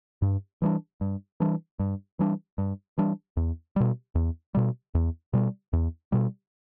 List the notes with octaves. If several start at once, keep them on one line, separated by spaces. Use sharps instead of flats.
G2
E3 G3 D4
G2
E3 G3 D4
G2
E3 G3 D4
G2
E3 G3 D4
E2
B2 G3
E2
B2 G3
E2
B2 G3
E2
B2 G3